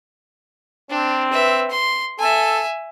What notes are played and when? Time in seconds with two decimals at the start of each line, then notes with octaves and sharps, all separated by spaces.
0.90 C4 D4
1.33 B4 E5
1.71 C6
2.19 A4 E5 G#5